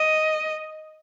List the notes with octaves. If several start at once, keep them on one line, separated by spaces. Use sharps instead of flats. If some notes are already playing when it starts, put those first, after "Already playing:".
Already playing: D#5